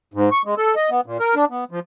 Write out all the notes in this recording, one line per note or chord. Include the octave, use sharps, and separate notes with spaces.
G#2
C#6
G#3
A4
D#5
B3
A#2
A#4
D4
B3
F3